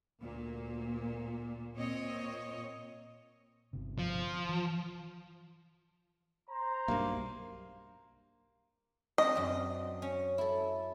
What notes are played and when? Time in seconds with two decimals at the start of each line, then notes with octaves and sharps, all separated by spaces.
0.21 D2 A#2 A#3
1.75 A#2 C4 C#5 D#5
3.73 G1 C3
3.99 F3
4.49 E3
6.50 C5 A#5
6.88 B1 G2 A#3
9.18 C4 D4 D#5
9.35 F#2 C4
10.02 C#4
10.38 E4 A4